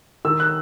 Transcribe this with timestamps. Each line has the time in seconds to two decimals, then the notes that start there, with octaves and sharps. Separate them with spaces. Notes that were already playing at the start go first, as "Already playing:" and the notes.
0.25 D#3 E6
0.40 F#6